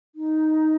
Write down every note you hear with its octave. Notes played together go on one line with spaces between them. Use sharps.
D#4